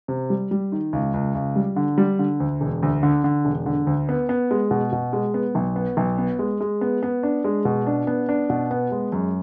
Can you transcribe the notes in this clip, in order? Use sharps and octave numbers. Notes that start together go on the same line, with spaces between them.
C3
G3
G3
D#3
C#2
C#2
C#2
G3
D3
G3
D3
D2
E1
D2
D3
D3
E1
D3
D2
B3
B3
G#3
B2
B2
G#3
B3
B1
B3
B1
B3
G#3
G#3
B3
B3
D4
G#3
B2
D4
B3
D4
B2
B3
G#3
F#2